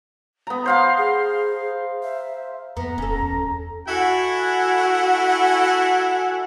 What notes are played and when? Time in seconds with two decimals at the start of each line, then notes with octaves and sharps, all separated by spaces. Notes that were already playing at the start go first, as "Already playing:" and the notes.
0.47 B3 A#5
0.66 C5 F5 F#5 C6
0.98 G#4
2.03 E5
2.77 F2 B3 A#5
2.98 E1 C#4 A4
3.22 E2
3.88 E4 F#4 A4 F#5 G#5